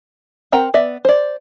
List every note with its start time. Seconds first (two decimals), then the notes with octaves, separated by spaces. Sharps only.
0.52 C4 A#4 F#5 G5 A#5
0.74 B3 D5 E5
1.05 C5 D5